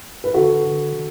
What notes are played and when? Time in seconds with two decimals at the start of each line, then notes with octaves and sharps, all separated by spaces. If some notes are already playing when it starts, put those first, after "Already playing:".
0.24 B4
0.34 D3 F#4 A4
0.64 D3
0.92 D3